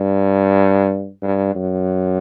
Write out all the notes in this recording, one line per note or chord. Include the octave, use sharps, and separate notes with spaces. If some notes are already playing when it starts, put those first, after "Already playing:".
Already playing: G2
G2
F#2